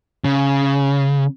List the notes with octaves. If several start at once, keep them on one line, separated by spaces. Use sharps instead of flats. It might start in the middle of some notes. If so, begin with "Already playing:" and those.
C#3